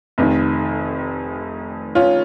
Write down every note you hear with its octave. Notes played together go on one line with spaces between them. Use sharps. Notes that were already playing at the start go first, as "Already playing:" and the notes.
F1 F2 D#3
C#4 F4